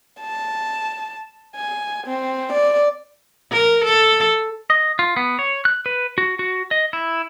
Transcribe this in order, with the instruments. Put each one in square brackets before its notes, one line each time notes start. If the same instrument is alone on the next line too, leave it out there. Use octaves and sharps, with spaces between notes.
[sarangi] A5
G#5
C4
D5
[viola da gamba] A#4
A4
[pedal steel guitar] D#5
F4
B3
C#5
F#6
B4
F#4
F#4
D#5
E4